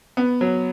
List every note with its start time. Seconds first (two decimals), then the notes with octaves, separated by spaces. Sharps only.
0.17 B3
0.41 F#3